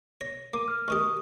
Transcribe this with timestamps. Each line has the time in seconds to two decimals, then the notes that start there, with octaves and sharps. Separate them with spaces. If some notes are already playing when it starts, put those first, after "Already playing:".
0.21 C#5 A#6
0.54 A#3 D6 D#7
0.68 F6
0.88 D2 D#3 G4 C#6 D#6